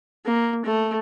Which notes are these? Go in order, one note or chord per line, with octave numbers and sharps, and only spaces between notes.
A#3
A3